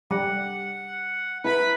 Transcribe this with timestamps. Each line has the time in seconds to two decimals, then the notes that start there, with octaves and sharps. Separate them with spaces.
0.11 G3 F#5
1.44 E4 B4 A#5 B5